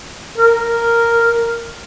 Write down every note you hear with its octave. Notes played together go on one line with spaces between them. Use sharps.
A#4